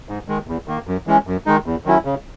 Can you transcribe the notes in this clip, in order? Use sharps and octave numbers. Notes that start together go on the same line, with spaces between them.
G#2
D#3 G#3
E2
D#3 A#3
F#2
E3 G#3 C#4
F#2
D#3 G#3 D#4
E2
D#3 F#3 C#4 E4
C#3